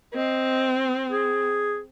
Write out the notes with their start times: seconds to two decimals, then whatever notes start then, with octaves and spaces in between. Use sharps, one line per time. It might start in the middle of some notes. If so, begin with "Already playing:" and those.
0.14 C4 D#5
1.11 G#4